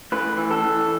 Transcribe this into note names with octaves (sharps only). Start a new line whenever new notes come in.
A2 B4
E3
A4
E3